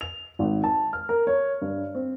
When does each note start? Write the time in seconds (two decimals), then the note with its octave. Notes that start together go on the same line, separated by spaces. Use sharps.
0.01 F7
0.39 G#1
0.64 A5
0.93 F6
1.09 A#4
1.27 C#5
1.62 G2
1.95 C4